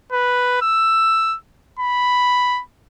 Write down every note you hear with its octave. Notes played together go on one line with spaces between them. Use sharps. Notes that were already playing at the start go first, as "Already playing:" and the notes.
B4
E6
B5